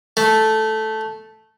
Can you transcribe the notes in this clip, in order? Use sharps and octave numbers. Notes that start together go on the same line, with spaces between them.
A3